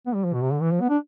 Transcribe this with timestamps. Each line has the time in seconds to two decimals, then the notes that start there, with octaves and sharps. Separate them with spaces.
0.07 B3
0.15 G3
0.24 F3
0.34 B2
0.42 C3
0.53 D3
0.61 E3
0.71 F3
0.81 B3
0.89 D4